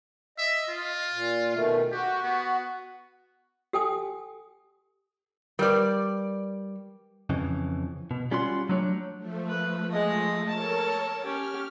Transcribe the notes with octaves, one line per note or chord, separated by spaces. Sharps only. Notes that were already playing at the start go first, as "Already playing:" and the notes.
D#5 E5
F4
A#2
B2 D#3 A3
F#4 G4
B3
G4 A4 G5 G#5 D#6
G3 A#4 B4 D5
F2 C#3 E3
B2
G3 C#4 F4 F#4 C6
F#3 A3 D4 C#5
F3 A3
B4
G#3 D#5
A4 A#4 C#5 A5
C#4 G4 F6